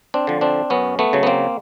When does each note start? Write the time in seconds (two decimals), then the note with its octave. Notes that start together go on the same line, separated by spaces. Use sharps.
0.14 C4 D4
0.27 D3 F3
0.41 C4 D4
0.70 F#2 B3 C#4
0.99 A3 B3
1.13 C#3 F#3
1.23 B3
1.27 A#3 C4